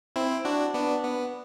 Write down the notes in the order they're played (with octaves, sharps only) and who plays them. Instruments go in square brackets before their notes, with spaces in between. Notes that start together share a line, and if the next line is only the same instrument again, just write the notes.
[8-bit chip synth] C4 E4
D4 F#4
B3 D4
B3